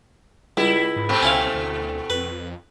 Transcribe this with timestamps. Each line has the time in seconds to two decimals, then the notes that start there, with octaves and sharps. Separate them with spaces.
0.57 C#2 G3 E4
0.96 G#2
1.09 B2 A3 C4
1.22 C#2 C#4 E4 F5
1.54 D2
2.10 F2 B4